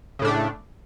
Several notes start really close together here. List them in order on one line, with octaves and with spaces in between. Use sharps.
C#3 A2 D4 A3